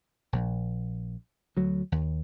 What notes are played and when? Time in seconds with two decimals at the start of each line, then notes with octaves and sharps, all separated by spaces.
0.33 A#1
1.57 D2 F#3
1.92 D#2